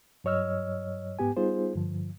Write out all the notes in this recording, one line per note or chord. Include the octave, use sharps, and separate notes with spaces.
G2 F#3 C#5 D#5 E6 F6
G#2 B3 G4 G#5
G3 B3 D#4 F4 G#4 C5
G2 D3 F3